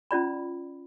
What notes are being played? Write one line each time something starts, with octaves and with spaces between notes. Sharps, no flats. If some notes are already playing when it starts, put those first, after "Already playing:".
C#4 F4 D5 B5